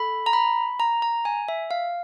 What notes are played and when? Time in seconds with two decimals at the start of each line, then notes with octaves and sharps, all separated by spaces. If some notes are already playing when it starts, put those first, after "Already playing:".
Already playing: A4 B5
0.26 A#5
0.33 B5
0.80 A#5
1.02 A#5
1.25 G#5
1.48 E5
1.71 F5